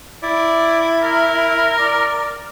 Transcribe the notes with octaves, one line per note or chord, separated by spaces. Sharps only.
E4 D5
A#4
D5